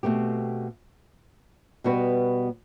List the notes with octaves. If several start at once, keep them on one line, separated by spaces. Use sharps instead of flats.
B2 A3 C4 G4
B2 G3 B3 F#4 B4